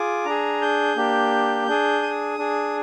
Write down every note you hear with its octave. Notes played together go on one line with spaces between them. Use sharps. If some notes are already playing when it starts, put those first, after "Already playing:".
Already playing: F4 G#4 D6
D4 G#4 A#5
G6
A#3 D4 G4
D4 G#4
D#6
D4 G#4